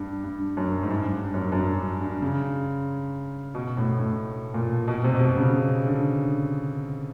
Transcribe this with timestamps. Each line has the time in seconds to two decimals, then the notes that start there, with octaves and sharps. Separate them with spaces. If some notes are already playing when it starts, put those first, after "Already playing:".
Already playing: G2
0.24 G2
0.57 F#2
0.83 G#2
0.90 G2
1.13 G2
1.34 F#2
1.52 F#2
1.56 G2
1.78 G2
2.01 G2
2.22 C#3
3.55 B2
3.77 A2
3.99 A2
4.54 A#2
4.88 B2
5.04 C3
5.14 B2
5.21 C3
5.37 C#3
5.53 C#3
5.86 D3